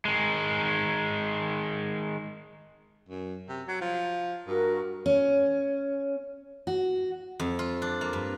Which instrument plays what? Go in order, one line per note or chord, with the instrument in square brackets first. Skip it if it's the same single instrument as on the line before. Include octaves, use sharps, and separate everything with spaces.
[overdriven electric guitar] D#3 G#3
[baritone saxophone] F#2
C3
F#3
F3
[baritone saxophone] G2 [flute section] F#4 A#4
[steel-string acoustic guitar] C#4
F#4
[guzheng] F2
F4
D4
A#3
G2